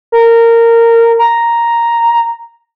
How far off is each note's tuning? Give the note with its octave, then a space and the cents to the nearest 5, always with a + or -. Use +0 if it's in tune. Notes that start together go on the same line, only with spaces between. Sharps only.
A#4 -15
A#5 +0